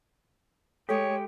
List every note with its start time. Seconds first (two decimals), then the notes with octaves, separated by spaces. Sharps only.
0.89 G#3 G4 A4 C#5